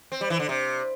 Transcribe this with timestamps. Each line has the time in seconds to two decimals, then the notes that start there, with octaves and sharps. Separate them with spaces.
0.12 C4
0.21 G3
0.30 E3
0.40 D3
0.49 C3